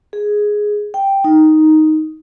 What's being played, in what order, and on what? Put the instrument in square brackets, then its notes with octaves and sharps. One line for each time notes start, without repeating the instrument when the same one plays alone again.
[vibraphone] G#4
G5
D#4